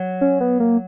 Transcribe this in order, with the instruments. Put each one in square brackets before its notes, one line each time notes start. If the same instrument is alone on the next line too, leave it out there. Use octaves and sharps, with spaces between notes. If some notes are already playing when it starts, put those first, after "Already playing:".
Already playing: [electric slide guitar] F#3
[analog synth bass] C#4
B3
A#3